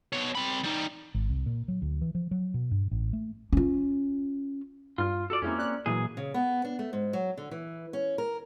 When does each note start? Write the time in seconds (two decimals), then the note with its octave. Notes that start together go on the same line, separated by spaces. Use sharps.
0.13 B2 C#5
0.35 C4 B5
0.64 G3 D#4
1.14 G#1
1.30 C2
1.46 A#2
1.68 F#3
1.82 D2
2.01 E3
2.15 F3
2.31 F#3
2.54 B2
2.71 G2
2.91 A1
3.13 A3
3.53 C#4 F4
4.98 G2 F4
5.30 F#4 A4 D5
5.42 F2 G#3 A#3 C4 C#4 E4
5.59 D5 F#6
5.86 A#2 E3 F#3 G#4
6.17 C#3
6.34 B3
6.64 D4
6.79 A3
6.93 G#2
7.13 F#3
7.38 D3
7.51 E3
7.93 C#4
8.18 A#4